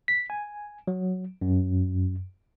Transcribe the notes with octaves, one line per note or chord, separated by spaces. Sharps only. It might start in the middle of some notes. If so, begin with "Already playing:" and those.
B6
G#5
F#3
F#2